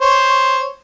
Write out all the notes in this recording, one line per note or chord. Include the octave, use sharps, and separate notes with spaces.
C5 C#5